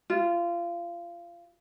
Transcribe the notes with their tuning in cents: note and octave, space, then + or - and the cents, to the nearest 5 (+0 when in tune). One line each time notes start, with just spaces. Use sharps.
F4 -25